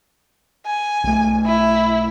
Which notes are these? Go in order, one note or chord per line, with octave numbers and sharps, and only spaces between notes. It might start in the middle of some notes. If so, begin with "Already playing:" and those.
G#5
B1 A3
E4